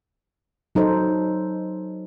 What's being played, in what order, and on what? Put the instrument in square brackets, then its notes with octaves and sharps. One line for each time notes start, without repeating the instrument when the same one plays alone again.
[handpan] F#3 D#4 A4 C5